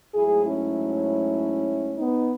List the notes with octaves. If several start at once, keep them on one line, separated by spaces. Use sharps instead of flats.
G#2 F#3 A3 E4 G#4
C#4 E4
B3 D#4